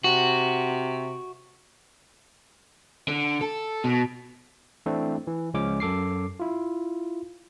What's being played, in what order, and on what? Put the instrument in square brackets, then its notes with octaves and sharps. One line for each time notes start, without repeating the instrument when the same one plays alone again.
[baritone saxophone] C3 [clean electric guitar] F#4
[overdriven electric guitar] D3
A4
B2
[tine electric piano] E3 A3 C4 D4 E4
E3
C#2 F3 G#3 C#4 D6
F#2 A4 D6 C7
E4 F4